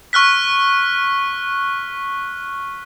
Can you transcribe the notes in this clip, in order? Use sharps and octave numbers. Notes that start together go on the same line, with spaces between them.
C#6 F6 F#6 B6